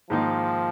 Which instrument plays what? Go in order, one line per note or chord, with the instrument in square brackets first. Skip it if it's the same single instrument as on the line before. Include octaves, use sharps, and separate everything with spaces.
[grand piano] G#2 D#3 A#3 D#4 [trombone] F3